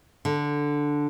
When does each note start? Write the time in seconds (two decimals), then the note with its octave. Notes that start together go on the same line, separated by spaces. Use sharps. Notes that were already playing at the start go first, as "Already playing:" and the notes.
0.25 D3